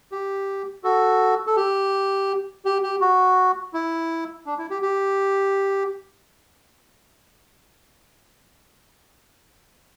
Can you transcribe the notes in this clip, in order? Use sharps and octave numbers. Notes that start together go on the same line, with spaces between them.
G4
F#4 A4
A4
G4
G4
G4
F#4
E4
D4
E4
G4
G4